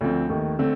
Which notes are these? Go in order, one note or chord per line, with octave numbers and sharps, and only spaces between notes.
D2 D3 F3 C4
D#2 D#3 A3
D3 A3 C4